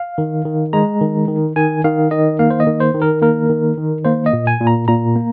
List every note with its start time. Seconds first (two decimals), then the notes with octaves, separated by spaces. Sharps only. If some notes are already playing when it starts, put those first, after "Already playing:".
Already playing: F5
0.18 D#3
0.45 D#3
0.73 G#3 A#5
1.01 D#3
1.28 D#3
1.56 D#3 G#5
1.84 D#3 F5
2.11 D#3 D#5
2.39 A#3 F5
2.50 C5
2.60 D#5
2.67 D#3
2.80 C5
2.94 D#3
3.02 A#4
3.22 A#3 A#4
3.49 D#3
3.77 D#3
4.05 A#3 C5
4.26 D#5
4.33 A#2
4.47 G#5
4.60 A#2
4.67 A#5
4.88 A#2 A#5
5.16 A#3